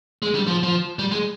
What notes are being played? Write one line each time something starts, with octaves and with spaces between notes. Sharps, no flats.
G#3
G3
F3
F3
G3
G#3